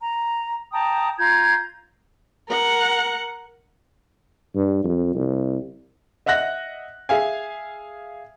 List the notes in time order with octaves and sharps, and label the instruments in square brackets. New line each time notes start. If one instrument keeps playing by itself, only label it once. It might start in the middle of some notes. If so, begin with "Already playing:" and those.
[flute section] A#5
G5 A5 A#5 D#6
F4 A#5 G6 G#6
[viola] A#4 F#5
[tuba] G2
F2
C2
[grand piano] D#5 E5 F#5 F#6 A#6
G#4 E5 F5 G#5